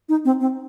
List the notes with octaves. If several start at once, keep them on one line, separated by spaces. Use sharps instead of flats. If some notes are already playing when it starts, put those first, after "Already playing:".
D#4
C4
C4